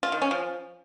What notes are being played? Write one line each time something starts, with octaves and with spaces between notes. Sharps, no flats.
F4
D#3
C#4
F3